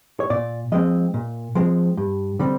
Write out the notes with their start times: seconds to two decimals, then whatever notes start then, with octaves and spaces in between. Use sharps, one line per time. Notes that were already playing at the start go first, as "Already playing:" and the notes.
0.20 C#5
0.30 A#2 D5
0.72 F3 G#3 C4 D#5
1.14 A#2
1.55 F3 G#3 C4
1.97 G2
2.39 D3 G3 C4